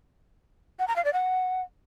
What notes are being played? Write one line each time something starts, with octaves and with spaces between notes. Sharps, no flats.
F#5
A#5
F5
D5
F#5